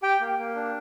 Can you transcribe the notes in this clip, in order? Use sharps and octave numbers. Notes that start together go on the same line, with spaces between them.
G4 G5
A#3
A#3
D4